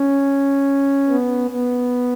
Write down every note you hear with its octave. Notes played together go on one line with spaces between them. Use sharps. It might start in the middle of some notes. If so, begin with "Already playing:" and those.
Already playing: C#4
B3
B3